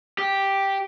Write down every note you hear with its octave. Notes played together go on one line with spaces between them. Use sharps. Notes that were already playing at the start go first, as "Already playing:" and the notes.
G4